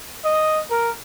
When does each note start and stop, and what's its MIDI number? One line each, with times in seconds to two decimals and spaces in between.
0.25 0.61 75
0.70 0.90 70